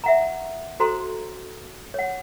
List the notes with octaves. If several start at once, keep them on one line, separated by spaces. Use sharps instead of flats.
E5 F#5 A#5
F#4 A4 C5 A#5 C6
C#5 F#5